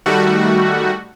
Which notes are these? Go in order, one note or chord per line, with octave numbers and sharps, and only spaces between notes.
D#3 G3 A3 F#4